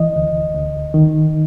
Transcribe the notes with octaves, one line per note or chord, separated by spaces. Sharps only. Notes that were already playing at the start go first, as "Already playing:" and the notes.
Already playing: E3 D#5
D2
D2
D#3